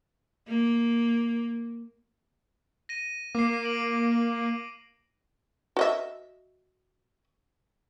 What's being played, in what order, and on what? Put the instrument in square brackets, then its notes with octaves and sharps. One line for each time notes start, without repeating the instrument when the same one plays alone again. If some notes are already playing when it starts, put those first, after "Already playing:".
[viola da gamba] A#3
[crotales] A#6 D#7
[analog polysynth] A#3 [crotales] D6 C7
[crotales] D7 F#7
[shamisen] F#4 D#5 E5